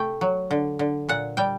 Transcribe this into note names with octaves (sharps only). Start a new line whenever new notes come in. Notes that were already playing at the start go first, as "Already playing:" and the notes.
Already playing: C3 A3 G5
F#3
D3
D3
A#2 F#5
G3 G5